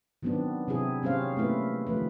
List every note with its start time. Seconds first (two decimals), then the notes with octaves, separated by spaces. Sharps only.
0.23 D#3 F#3 B3 C4 D4
0.68 C3 F#3 C4 D4 E4 G#4
1.03 G3 C4 C#4 C5 F5
1.37 A3 A#3 E4 B4
1.87 D#3 F3 A3 B4